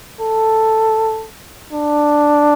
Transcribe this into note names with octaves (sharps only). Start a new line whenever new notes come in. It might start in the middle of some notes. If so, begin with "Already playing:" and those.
A4
D4